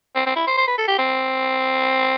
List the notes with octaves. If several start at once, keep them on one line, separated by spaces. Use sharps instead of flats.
C4
C4
E4
C5
C5
B4
A4
G4
C4